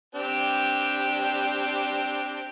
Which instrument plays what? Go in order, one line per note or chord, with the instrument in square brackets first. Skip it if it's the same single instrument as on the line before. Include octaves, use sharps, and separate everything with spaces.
[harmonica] C4 D4 G4